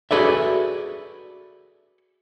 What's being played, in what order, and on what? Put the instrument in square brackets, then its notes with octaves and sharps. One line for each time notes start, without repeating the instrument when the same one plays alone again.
[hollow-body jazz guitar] F#4 G#4 A4 B4 D5 E5